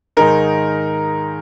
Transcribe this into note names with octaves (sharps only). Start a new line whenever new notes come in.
G#2 D#3 G#3 D#4 A#4